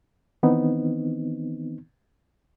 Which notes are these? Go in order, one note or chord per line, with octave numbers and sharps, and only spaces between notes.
D#3 E3 B3 C4 D#4